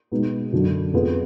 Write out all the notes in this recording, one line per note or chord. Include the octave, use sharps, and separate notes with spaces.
B2 G#3 B3 D#4
F#2 D3 F#3 D4
F2 F3 B3 F4 G#4